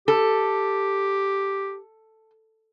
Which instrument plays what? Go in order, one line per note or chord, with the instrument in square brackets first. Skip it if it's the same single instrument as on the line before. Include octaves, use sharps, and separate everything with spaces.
[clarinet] G4 [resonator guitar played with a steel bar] A4